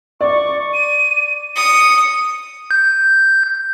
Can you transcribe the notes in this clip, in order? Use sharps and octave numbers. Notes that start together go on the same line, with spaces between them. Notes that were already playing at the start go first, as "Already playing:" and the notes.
D5 C#6
D#7
D#6 C#7
G6